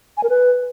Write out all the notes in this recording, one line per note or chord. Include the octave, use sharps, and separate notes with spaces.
G#5
A#4
B4